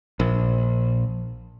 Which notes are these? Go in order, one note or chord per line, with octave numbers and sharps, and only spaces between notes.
A#1